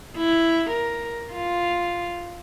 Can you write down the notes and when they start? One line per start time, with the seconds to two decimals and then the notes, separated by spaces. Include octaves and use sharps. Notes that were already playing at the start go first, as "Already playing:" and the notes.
0.17 E4
0.70 A#4
1.32 F4